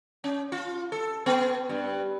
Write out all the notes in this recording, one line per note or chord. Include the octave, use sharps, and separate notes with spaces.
C#4
F4
A4
B3
G2